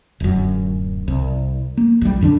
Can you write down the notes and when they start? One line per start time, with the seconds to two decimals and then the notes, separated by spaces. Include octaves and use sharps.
0.20 D1 F#2
1.08 C2
1.77 A#3
2.01 A#1 G3
2.21 F#2 D3 C4 D4